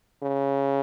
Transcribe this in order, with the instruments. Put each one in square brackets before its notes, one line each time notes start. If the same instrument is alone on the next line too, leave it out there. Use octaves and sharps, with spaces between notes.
[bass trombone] C#3